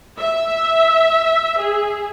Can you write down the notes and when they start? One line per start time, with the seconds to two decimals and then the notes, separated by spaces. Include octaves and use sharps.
0.19 E5
1.59 G#4